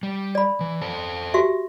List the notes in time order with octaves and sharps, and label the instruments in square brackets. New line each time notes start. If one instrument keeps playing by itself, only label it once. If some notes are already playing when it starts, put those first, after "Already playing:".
[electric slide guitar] G3
[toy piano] D5 B5
[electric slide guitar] E3
A4 C5 A5
[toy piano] F#4 G4 E5